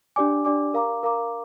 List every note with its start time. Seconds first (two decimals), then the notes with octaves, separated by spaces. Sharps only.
0.16 D4 G4 D5 G#5 D6
0.45 D4 G4 D5 G#5 D6
0.74 A#4 F5 A#5 D6
1.03 A#4 F5 A#5 D6